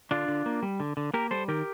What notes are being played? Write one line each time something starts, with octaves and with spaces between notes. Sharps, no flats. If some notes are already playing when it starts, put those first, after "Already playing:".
D3 D4 F4
D3
A#3
G3
D3
D3
A#3 G4 A#4
G3 A4 C5
D#3 G4 A#4